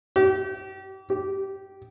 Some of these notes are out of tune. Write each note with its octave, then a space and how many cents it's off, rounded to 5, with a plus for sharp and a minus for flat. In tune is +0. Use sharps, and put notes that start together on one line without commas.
G4 -30
G4 -15